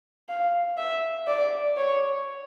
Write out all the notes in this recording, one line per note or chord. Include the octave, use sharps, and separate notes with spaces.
F5
E5
D5
C#5